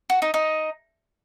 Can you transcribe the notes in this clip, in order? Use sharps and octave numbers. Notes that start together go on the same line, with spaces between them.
F#4
D#4
D#4